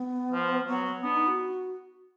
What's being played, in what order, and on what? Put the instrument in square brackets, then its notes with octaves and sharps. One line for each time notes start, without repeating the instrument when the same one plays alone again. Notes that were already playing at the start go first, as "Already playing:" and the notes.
Already playing: [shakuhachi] B3
[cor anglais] F3
[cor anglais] F#3 [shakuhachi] B3
[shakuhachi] B3
[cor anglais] B3 [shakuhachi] D4
[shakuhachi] D#4
F#4